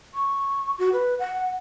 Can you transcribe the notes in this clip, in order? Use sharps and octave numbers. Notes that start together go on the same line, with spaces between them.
C#6
F#4
B4
F#5